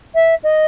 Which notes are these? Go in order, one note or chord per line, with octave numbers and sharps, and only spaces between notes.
E5
D#5